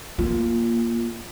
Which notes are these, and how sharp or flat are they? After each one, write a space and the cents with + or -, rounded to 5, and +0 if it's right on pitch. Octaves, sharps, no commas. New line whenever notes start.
A#3 +5 F4 -10